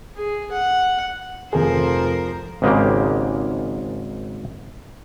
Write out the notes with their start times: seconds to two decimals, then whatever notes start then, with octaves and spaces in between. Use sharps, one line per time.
0.17 G#4
0.52 F#5
1.53 F1 F3 G#4 A#4 C5
2.62 G#1 G#2 C#3 G#3 A#3 G4